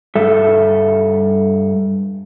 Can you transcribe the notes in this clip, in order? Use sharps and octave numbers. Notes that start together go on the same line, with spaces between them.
G2 A4 E5